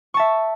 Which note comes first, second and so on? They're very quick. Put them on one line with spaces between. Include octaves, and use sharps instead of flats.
C#6 A5 E5